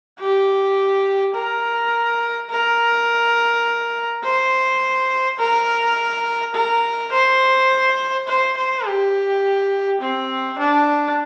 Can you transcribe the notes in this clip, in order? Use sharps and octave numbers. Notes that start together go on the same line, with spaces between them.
G4
A#4
A#4
C5
A#4
A#4
C5
C5
C5
G4
C4
D4